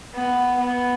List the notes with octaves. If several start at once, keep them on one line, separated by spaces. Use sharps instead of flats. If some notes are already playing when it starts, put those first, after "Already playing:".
B3
B3